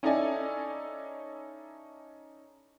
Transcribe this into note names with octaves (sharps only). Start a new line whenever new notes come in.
C#4 D#4 E4 A4 D5 G#5